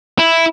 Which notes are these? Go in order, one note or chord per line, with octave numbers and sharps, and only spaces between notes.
E4